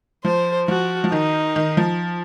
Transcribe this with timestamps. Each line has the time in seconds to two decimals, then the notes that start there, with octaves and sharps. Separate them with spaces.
0.24 F3 C5
0.68 F3 F#4
1.04 F3
1.12 D#3 D#4
1.56 D#3
1.77 F3